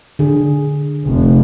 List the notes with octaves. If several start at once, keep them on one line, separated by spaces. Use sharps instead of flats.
D3 G#4
F1